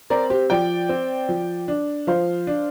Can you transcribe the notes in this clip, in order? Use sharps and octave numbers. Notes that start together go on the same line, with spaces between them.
C4 A#4 D5
G4 C5
F3 D5 G5
C4
F3
D4
F3 C5 F5
D4